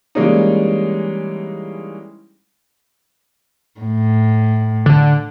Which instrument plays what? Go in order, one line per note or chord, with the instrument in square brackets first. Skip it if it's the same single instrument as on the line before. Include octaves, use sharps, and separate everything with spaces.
[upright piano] E3 G3 G#3 A#3 C#4 D#4
[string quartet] A2
[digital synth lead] D3